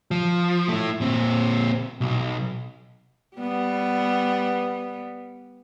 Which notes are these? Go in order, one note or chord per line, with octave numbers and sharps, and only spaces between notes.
F3
A3 E4
A#2 C4
B1
G3 B3